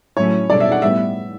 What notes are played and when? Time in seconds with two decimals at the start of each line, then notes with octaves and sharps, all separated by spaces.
0.17 A2 F#3 A3 C#4 E4 C#5
0.50 B2 G3 D4 A4 D5
0.60 E5
0.72 F#5
0.82 A2 G3 B3 E5